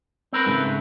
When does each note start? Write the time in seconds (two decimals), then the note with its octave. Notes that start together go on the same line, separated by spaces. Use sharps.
0.33 C4 A#4 B4
0.46 G#2 C#3 A3